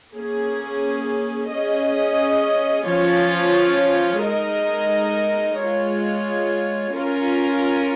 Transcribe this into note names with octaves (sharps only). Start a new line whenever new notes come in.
A#3 C#4 G#4
C#4 G#4 D#5
F3 C#4 F4 C#5
G#3 D#4 A#4 D#5
G#3 F4 C#5
C#4 F4 A#4